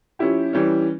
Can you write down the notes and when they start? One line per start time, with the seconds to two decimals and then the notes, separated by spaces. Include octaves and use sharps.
0.19 F3 C#4 E4 G4
0.53 E3 G3 C#4